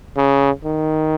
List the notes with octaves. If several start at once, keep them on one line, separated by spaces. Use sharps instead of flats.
C#3
D#3